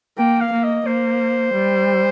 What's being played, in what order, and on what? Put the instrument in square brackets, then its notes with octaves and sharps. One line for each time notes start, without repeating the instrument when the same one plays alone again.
[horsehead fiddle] A#3 [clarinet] G5
[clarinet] F5
[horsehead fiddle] A#3
[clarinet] D#5
[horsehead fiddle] A#3 [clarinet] C5
[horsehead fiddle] G3